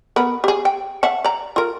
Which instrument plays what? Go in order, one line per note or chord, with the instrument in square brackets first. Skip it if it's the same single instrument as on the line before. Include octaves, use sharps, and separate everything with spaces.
[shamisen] B3 A#4 B4
G4 G#4
G5
E5 F#5 A5
D5 A#5
F4 A#4